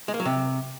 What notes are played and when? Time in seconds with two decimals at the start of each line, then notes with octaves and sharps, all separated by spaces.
0.08 G#3
0.14 A#3
0.20 F#3
0.25 C3